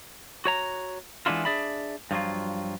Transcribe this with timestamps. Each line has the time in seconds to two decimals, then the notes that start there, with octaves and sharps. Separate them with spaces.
0.45 F#4 C#5 A#5
1.26 E3 G#3 B3 D4 E4 F4
1.45 D4 G#4 D5 E5 B5
2.11 G2 F3 F#3 F4